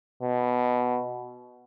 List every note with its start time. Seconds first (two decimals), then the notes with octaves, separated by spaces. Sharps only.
0.23 B2